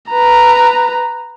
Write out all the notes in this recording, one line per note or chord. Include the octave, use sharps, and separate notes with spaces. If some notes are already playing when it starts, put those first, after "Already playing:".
B4 A#5